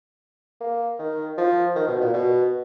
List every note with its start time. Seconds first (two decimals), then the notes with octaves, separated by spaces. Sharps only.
0.61 A#3
0.99 D#3
1.38 F3
1.76 D#3
1.88 B2
2.01 A#2
2.14 B2